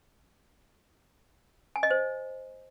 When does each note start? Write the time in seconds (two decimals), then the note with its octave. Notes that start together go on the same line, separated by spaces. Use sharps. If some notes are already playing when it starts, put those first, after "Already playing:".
1.76 G#5
1.83 D#5
1.90 C5